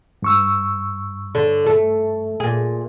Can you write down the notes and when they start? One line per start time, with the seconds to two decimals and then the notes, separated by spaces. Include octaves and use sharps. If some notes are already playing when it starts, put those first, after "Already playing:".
0.22 G2 C#6 E6
1.35 D3
1.66 A3
2.40 A#2 G#4